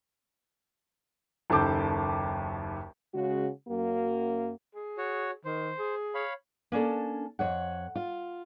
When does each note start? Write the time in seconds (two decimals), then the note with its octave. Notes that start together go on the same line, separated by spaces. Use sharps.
1.50 F#1 D#2 A4 A5 D6 G6
3.13 C#3 G#3 F#4
3.68 F#2 A#3 F#4
4.75 G#4
4.98 F#4 C#5
5.45 D#3 C5
5.79 G#4
6.15 C#5 F5 B5
6.72 A#3 C#4 D4 A4
7.39 F2 C#5 F#5
7.95 F4